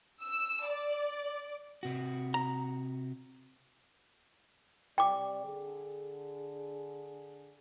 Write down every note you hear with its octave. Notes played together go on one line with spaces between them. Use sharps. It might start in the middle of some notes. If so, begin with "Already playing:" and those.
E6
D5
C3 F#4
A#5
C3 G3 D5 G5 D6
D3 G#4